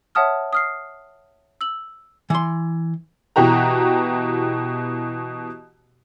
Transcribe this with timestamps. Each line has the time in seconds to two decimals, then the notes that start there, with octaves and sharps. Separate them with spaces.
0.15 C#5 E5 F#5 A5 D#6 F6
0.53 D#6 F6 C7
1.61 E6 F#7
2.30 E3 C6
3.36 B2 E3 F#4 G4 A#5